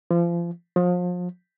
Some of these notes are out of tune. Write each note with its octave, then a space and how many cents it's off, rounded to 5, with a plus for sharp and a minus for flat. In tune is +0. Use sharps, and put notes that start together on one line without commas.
F3 -30
F3 +35